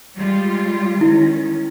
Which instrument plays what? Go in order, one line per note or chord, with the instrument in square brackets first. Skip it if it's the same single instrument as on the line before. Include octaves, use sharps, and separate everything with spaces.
[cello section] G3 G#3 F4
[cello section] D#3 C#4 [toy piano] E4